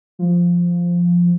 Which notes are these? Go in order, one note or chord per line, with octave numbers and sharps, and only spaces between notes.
F3